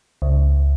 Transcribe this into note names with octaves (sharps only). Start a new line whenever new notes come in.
C#2